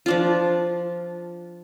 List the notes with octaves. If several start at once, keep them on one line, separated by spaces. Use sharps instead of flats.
F3 D4 F4